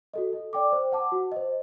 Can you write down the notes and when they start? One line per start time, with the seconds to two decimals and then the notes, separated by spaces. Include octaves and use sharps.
0.14 F#4 A4 D#5
0.33 A4
0.53 D5 G5 D6
0.72 C5
0.92 F#5 A5 D6
1.12 F#4
1.32 C5 D#5